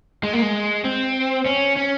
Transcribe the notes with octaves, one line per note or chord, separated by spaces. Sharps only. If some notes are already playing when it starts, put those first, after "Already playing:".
G#3
A#3
G#3
C4
C#4
C#4